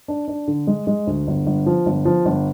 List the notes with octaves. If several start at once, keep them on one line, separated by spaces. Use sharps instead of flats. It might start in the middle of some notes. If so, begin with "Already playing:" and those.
D4
D4
D3
G#3
G#3
D2
G1
G1
F3
G1
F3
G1